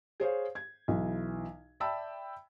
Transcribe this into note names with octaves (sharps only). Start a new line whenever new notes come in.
G#4 C5 C#5 F5
G#6
B1 E3
D5 E5 G5 A5 B5 E6